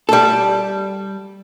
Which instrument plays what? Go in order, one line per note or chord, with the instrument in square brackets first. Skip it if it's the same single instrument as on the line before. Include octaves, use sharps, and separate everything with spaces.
[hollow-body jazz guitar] G3 A4